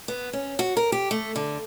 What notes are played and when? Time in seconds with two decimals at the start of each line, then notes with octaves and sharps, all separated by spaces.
0.08 B3
0.33 C#4
0.59 F#4
0.77 A#4
0.92 G4
1.11 A3
1.36 D3